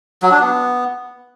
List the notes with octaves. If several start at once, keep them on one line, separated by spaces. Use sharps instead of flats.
F#3
D4
B3